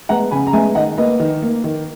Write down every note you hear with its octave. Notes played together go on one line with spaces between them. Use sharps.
G#3 B3 F#5 A#5
C#3 G#5 B5
A#5
G#3 B3 E5 G#5
D#3 D#5 F#5
A#3 B4 D#5
D#3
A#3
D#3